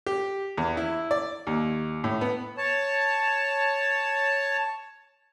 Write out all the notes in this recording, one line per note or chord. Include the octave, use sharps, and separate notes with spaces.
G4
E2
E4
D5
D#2
A2
B3
C#5 A5